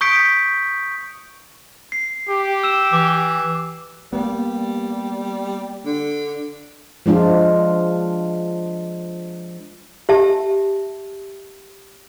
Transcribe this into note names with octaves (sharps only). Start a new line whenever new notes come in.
C#6 D#6 G6 B6 C#7 D7
C7
G4
E6 E7
E3 D6
G3 A#3 B3
D3
F3 G#3 D4 F4
G4 E5 A5